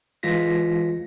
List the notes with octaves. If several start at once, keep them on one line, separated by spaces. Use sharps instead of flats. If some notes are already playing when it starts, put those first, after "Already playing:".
E3 G#3 F4 A#6 B6